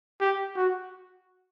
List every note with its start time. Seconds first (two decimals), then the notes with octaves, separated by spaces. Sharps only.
0.21 G4
0.56 F#4